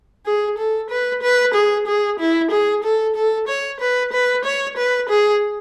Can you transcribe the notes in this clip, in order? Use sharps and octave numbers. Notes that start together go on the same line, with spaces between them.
G#4
A4
B4
B4
G#4
G#4
E4
G#4
A4
A4
C#5
B4
B4
C#5
B4
G#4